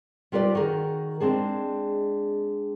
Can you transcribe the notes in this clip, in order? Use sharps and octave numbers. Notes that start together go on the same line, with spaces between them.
G3 F4 A#4 B4 D5
D#3 F#4 G#4 A#4
G#3 C4 D4 G#4